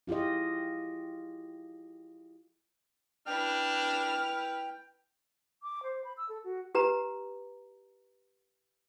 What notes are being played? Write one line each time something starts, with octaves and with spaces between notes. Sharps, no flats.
E4 F4 G4 G#4 D#5
D4 E4 B4 G5 F6
D6
C5
B5
E6
A4
F#4
G4 B4 A#5